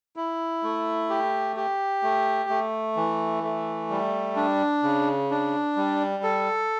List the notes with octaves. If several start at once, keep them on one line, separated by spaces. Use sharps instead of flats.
E4
A3
G4
G4
A3
A3
E3
A3
G3
D4
C#3
D4
G3
A4